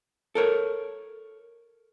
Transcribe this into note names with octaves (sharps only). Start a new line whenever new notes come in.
A4 A#4 C#5